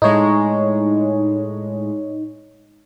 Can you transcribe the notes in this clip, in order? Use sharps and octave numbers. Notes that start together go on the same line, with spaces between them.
A2 G#3 D#4 C#5